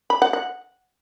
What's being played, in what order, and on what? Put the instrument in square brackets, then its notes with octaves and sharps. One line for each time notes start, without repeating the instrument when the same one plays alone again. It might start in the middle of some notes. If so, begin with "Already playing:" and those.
[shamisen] B5
F#5
F#5